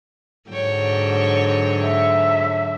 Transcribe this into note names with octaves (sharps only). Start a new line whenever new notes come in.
G#2 D3 F#3 C#5 G5
E5